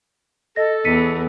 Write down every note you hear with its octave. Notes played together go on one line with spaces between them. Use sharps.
A4 D#5 A#6
E2 B6 C#7 D#7